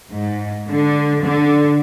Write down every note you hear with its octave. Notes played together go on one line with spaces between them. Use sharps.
G#2
D3
D3